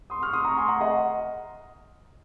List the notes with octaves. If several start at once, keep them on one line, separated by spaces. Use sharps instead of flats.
C6 D#6
C#6 F6
C6 D#6
A#5 C#6
G#5 C6
F#5 A#5
D#5 F#5